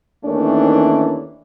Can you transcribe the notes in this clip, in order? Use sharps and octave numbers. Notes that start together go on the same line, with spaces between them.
D#2 D#3 E3 A3 C#4 D4